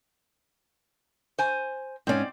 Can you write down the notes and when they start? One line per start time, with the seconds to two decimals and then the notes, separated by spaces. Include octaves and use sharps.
1.39 C5 G#5
2.07 G#2 C4 C#4 D5